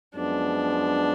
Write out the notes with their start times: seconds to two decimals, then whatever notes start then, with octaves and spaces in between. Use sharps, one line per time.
0.15 F#2 F3 G#3 B3 D4